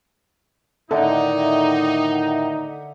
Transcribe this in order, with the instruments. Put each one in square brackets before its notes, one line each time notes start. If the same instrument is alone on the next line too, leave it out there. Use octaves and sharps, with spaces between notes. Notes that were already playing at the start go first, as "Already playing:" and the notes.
[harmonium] A2 D#3 [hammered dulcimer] D3 [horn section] D#4 [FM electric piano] A4 E5 F#5